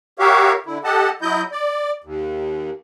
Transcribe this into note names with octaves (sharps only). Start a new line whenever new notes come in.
F#4 G4 A#4 C#5 E5 F5
D3 E4
G4 A4 D#5 F#5 A5
F#3 E4 D#5 G6
D5
D#2